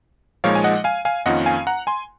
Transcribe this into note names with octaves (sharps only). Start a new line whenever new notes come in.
A#2 F3 G#3 D#4 C#5 F5
G#5
D#5 F#5
F5 G#5
F5 G#5
F2 D#3 A#3 C#4 F4 D#5 F#5
F5 G#5
F#5 A#5
G#5 C6